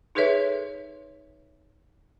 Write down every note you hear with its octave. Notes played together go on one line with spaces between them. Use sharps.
D#4 G#4 A4 B4 C#5 E5